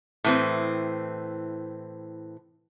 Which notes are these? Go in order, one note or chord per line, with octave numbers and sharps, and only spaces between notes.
A2 E3 C4